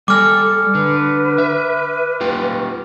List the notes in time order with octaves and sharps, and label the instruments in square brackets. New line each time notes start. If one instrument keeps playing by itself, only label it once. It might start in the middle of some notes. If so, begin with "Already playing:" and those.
[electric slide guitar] G3 G#5 [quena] A4 [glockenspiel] D6 F6
[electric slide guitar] D3 [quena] B4
[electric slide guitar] E5
A#3 F4 G4